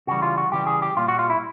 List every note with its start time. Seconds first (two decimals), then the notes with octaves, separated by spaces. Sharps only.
0.07 C#3 E3 G3 F#4
0.22 F4
0.38 F#4
0.52 C#3 E3 G3 G4
0.67 G#4
0.82 G4
0.97 A#2 G3 F4
1.08 F#4
1.19 F4
1.30 E4